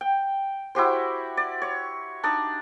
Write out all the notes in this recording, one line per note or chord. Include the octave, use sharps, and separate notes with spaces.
G5
E4 F#4 G4 C5
D5
C#5
D4 D#4 D5